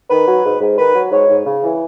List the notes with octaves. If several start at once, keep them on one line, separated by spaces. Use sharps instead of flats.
D#3 B4
F#3
G#2
G#2
D#3 B4
F#3
G#2 C#5
G#2
C#3
E3